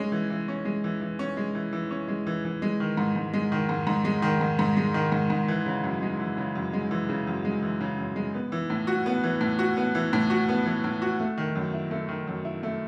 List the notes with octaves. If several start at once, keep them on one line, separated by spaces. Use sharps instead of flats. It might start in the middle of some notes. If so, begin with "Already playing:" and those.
Already playing: G#3 C#4
E3
E3
C#4
G#3
E3
E3
C#4
G#3
E3
E3
C#4
G#3
E3
E3
G#3
D#3
G#2
G#2
G#3
D#3
G#2
G#2
G#3
D#3
G#2
G#2
G#3
D#3
G#2
G#2
E3
C#3
F#2
G#3
E3
C#3
F#2
G#3
E3
C#3
F#2
G#3
E3
C#3
F#2
G#3
B3
E3
A2
F#4
B3
E3
A2
F#4
B3
E3
A2
F#4
B3
E3
A2
F#4
A3
D#3
F#2
E4
A3
D#3
F#2
E4
A3